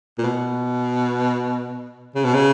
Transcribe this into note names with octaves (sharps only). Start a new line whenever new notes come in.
A#2
B2
C#3
B2
C#3